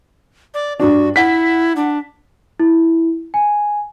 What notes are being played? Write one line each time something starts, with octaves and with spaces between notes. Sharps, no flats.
D5
G2 D4 F#4
E4 F#5 B6
D4
E4
G#5